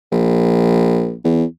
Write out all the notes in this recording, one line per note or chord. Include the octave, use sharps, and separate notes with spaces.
A#1
E2